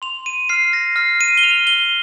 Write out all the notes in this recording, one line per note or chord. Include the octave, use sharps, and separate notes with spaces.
C6 F7
D#7
F6 C7
A#6
F6 C7
D#7
G7
F6 F7
G7